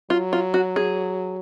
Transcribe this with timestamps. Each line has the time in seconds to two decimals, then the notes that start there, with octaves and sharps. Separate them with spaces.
0.10 F#3 F4
0.33 F4
0.54 F#4
0.76 G#4